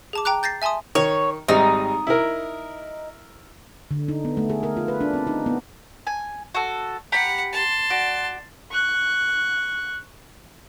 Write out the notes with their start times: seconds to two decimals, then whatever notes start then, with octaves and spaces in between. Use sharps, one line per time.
0.13 G#4 A5 D6
0.25 G5 A#5 D6 F#6
0.43 G6 A6 A#6 C7
0.62 E5 G#5 A5 C6 D#6
0.95 D#3 C#5
1.48 G#1 G3 D#4
2.07 E4 A#4
3.91 D3
4.08 D#4
4.25 B3
4.37 A3
4.50 G#4
4.63 A#4
4.77 F4
4.88 B4
5.01 D4
5.14 C4
5.27 D#4
5.46 B3
6.07 G#5
6.55 F#4 A4
7.12 G4 F#5 A#5 B5
7.52 A5 C6
7.90 F#4 D5
8.71 C#6 F#6